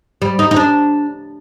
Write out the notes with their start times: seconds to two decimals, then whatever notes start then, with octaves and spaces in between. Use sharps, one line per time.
0.22 G3
0.39 D#4
0.51 D#4
0.56 D4